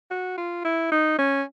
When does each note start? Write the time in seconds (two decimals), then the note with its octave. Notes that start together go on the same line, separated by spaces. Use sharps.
0.11 F#4
0.38 F4
0.65 E4
0.92 D#4
1.18 C#4